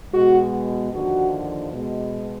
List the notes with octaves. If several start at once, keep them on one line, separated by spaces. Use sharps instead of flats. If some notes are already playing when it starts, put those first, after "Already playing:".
B2 G#3 F#4
D#2 D3 F3 F#4
B2 G#3